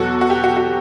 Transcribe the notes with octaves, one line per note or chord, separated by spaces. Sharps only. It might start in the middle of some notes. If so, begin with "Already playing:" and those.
Already playing: E2 B2 F#3 F#4 A4
F#4
G4
F#4
F#4